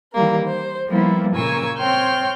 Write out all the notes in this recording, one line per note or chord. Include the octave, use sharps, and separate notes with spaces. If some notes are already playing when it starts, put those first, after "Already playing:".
D#3 E3 G3 A#3 A#4
C5
F3 G3 A#3 B3 E4
A#2 C#3 A#4 G#5 C#6 E6
C4 C#5 G5 C6 F6 G6